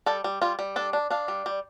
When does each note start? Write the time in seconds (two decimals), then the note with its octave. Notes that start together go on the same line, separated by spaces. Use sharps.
0.06 G3 A4
0.24 G3
0.42 G3 F4
0.59 G3
0.76 D4 A4
0.93 D4
1.10 D4 F5
1.28 G3
1.46 G3